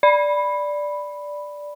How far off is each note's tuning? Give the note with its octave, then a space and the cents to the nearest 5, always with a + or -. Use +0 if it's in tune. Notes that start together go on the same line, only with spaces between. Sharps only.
D5 +0 B5 +0